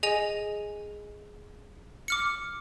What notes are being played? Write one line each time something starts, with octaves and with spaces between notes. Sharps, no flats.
G#4 D#5 G#5 F7
D6 F6 C#7